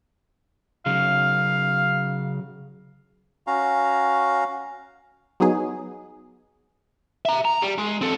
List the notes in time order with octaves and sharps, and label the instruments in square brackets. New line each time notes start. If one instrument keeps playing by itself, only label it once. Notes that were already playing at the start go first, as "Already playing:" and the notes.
[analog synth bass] C#3 [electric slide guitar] F#3 C#4 D#4 [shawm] F5
[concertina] C#4 F#4 F5 A#5
[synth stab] F#3 B3 D#4 G#4
[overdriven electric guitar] E5 A#5
A#5
G3
G#3
C4 A4